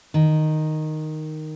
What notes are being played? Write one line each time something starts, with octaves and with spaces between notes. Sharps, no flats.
D#3